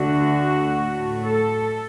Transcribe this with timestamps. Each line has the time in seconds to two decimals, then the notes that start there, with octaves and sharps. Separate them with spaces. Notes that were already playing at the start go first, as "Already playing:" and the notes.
Already playing: D2 D3 A3 F#4
0.75 A2 A3
1.24 A4